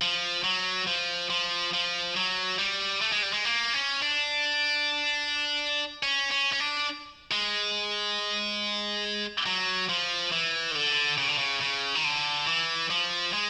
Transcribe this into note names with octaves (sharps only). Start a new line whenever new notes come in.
F3
F#3
F3
F3
F3
F#3
G3
A3
G#3
G3
G#3
A#3
C#4
D4
C#4
C#4
C#4
D4
G#3
F#3
F3
E3
D#3
D3
C#3
D3
C#3
C#3
D#3
D3
E3
F3
G#3